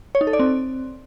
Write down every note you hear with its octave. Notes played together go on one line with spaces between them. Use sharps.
C#5
D#4
A4
D5
C4